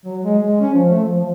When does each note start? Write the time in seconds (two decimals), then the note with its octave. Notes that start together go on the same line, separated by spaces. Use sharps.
0.05 F#3
0.24 G#3
0.39 G#3
0.61 C#4
0.74 F3
0.89 A3
1.03 F3
1.20 F3